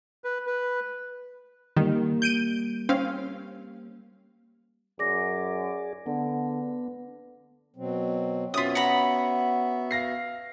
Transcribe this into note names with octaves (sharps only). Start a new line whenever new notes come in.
B4
B4
D#3 G3 A#3
G6 D7 D#7
C4 C#4 F5
F#2 G#4 D5 D6 A#6
D3 B3
B2 F#3 C4
B3 C#4 F4 F#4 E5 D#6 B6
F#5 A#5 B5
F5 A#6 C7